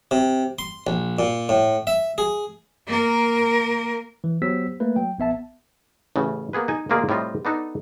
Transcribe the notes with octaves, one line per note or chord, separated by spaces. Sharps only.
C3
C6
A#1
A#2
A2
E5
G#4
A#3 A#4
E3
F#3 B3 G4 C5 E6 B6
A3 A#3 B4
F#3 G5
A#1 B3 E5 A5
A1 A2 C#3
A#3 B3 G#4 B4
D#4 G#5
D2 A#2 G#3 A#3 F4 G#4
A2 C3 G3 F4 D#5
B3 D4 D#4 A4